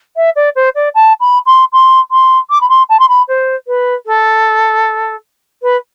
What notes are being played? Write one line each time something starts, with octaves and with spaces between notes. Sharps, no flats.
E5
D5
C5
D5
A5
B5
C6
C6
C6
D6
B5
C6
A5
C6
B5
C5
B4
A4
B4